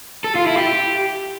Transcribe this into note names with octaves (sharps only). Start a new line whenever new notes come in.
A4
F4
E4
G4